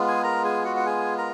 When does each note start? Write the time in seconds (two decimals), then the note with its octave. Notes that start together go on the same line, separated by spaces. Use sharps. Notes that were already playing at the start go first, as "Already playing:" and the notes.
Already playing: G#3 B3 F4
0.08 G#4 G#5
0.24 A#4 A#5
0.44 G#4 G#5
0.65 F#4 F#5
0.76 F#5
0.86 G#4 G#5
1.18 A#4 A#5